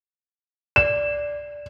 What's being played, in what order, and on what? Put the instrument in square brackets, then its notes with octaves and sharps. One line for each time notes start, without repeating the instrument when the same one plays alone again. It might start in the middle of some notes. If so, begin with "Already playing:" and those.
[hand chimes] D5 [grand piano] E7